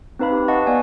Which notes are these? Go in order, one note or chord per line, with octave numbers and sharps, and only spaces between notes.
C4 D#4 B4 F5 B5
G4
B4 D#5 F5 F#5 A5 C#6
B3 D5 F5 F#5 G#5